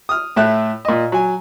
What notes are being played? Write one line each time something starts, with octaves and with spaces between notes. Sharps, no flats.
D#6 F6
A2 A3 E5 F#6
A#2 D#5
F#3 G#5